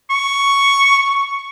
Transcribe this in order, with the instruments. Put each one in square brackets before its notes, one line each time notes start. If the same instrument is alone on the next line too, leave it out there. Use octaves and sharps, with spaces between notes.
[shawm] C#6